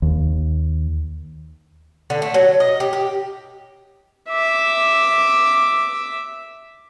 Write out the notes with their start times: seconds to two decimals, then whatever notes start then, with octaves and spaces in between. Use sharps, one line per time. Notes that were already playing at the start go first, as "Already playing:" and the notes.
0.02 D#2
2.10 D3
2.22 A3
2.34 F#3
2.60 D#5
2.80 G4
2.93 G4
4.30 E5 D6